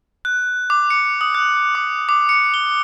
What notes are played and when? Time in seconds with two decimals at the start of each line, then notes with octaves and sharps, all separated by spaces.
0.25 F#6
0.70 D6
0.90 C#7
1.21 D#6
1.35 F#6
1.75 D6
2.09 D6
2.29 C#7
2.54 G7